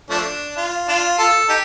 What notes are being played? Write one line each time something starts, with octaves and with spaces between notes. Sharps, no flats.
F3 A3 D4
F4
D4 F4
F4 A4
D#4 G4